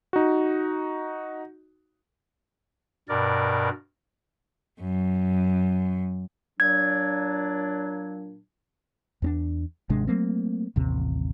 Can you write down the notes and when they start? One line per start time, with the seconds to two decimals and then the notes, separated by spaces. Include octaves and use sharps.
0.13 D#4 F#4
3.09 G2 B2 A#4 D5
4.80 F#2
6.60 A#2 F#3 D4 G#6
9.22 E2 C4 D4
9.90 G#1 C3 G#3 D4
10.07 F#3 A3 A#3 C4
10.76 A1 D#2 C3